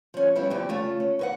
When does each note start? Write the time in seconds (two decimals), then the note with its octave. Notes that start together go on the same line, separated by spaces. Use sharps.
0.14 F3 C#4
0.36 G3 B3 C#4 E4
0.50 E2 C#3 F3 G4
0.69 C#3 A3 F4
1.00 C#4
1.19 E2 B4 F#5